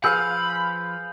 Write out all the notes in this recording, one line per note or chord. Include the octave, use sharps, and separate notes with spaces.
F3 G#4 B4 F5 B5 E6 G6